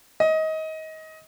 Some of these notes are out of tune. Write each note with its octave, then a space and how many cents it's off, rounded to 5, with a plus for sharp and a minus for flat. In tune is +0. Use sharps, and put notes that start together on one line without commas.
D#5 +25